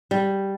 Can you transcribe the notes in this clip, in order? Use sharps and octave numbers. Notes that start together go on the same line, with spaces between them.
G3